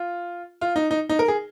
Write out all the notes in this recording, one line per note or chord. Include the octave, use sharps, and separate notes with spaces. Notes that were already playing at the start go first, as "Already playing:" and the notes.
Already playing: F4
F4
D#4
D#4
D#4
A#4
G#4